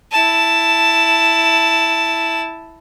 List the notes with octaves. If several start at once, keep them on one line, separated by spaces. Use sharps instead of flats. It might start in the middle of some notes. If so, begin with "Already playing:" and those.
E4 A5